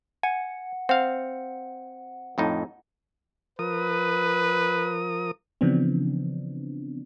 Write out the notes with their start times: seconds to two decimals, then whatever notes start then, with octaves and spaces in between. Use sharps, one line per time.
0.23 F#5 G#5
0.89 C4 F5 F#5
2.38 F2 A2 D#4
3.59 F3 A#4 B4 D#6
5.61 C#3 E3 F3 B3 C4 D4